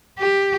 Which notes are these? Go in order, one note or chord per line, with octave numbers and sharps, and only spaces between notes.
G4